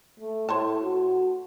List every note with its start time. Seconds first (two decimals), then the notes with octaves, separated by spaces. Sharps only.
0.20 A3
0.49 A2 C5 C#5 A5
0.82 F#4